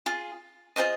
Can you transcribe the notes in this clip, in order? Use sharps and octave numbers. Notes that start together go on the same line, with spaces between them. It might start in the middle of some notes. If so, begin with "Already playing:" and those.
F4 G#4
F4 G#4 C5 D#5 D#6